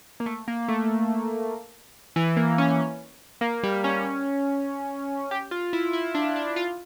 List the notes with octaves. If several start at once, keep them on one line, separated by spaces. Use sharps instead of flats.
A#3
A3
A#3
A3
E3
A#3
C#4
A#3
G3
C#4
G4
F4
E4
E4
D4
D4
F4